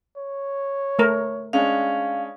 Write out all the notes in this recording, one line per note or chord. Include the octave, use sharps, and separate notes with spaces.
C#5
A3 A#4
G#3 C#4 D4 F5